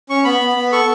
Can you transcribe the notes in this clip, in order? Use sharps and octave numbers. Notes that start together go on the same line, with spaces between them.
C#4 C#6
B3 B5
B3
B3
A4 C#6